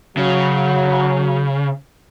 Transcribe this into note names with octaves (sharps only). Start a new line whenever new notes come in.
C#3 F#3